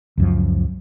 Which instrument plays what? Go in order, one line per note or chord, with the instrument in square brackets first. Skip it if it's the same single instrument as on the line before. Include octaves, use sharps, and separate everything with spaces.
[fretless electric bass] C#2 F#2 F3